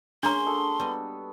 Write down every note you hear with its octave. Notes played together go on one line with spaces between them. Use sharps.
G#3 A#3 C#4 D4 A#5 C6
F#4 A4 D#6
G3 B3 D#5